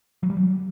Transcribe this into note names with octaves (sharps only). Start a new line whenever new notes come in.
F#3
G3
F#3